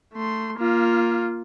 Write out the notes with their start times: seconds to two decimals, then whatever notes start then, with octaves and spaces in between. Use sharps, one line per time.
0.14 A3 C6
0.58 A#3 F4